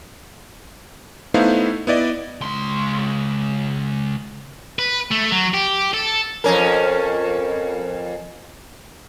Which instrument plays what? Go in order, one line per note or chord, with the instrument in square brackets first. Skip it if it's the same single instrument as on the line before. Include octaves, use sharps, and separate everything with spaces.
[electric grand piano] A3 B3 D#4 E4 C5 F5
B3 E4 D5 D#5
[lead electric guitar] C#2 C6
[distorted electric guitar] B4
A3
F#3
G4
A4
[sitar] F2 C#4 A#4